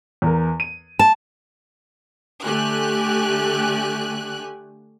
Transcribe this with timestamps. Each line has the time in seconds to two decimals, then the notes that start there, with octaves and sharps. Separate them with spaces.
0.22 E2 A#4
0.60 D#7
0.99 A5
2.45 D3 A3 G4 G#5 F#6